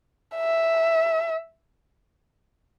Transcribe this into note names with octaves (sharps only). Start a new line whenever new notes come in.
E5